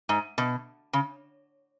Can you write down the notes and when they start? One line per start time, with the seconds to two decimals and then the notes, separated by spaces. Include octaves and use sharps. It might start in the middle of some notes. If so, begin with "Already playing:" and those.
0.09 G#2
0.38 B2
0.93 C#3